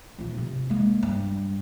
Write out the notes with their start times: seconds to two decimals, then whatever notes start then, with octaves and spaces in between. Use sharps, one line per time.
0.19 D#1 F4
0.38 C3
0.70 G#3 A#3
1.03 G2